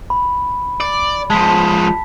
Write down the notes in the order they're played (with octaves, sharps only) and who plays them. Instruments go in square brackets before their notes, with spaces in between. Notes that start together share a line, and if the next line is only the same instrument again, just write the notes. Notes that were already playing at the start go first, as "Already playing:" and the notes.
[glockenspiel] B5
[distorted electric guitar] D5
[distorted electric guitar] F3 G#3 [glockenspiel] A5 B6